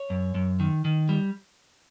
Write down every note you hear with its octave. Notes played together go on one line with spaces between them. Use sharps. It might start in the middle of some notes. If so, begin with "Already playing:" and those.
Already playing: C#5
F#2
F#2
D#3
D#3
G3